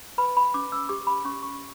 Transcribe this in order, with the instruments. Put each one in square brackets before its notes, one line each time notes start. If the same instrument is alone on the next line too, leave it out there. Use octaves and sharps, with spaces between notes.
[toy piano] B4 B5
B5
C#4 D6
E6
G4 D6
B5
C#4 C#6
C#6